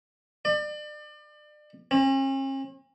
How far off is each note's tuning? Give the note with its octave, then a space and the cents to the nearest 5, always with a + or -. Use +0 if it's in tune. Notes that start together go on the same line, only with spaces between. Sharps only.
D5 +35
C#4 -45